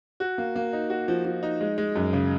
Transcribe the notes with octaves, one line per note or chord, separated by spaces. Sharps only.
F#4
A#3
A#3
D#4
F#4
F3
F3
D#4
G#3
G#3
F#2
C#3